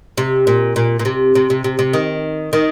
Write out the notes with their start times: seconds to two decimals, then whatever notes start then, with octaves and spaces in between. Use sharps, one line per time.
0.18 C3
0.47 A#2
0.76 A#2
0.99 A#2
1.05 C3
1.35 C3
1.50 C3
1.64 C3
1.79 C3
1.93 D#3
2.53 D#3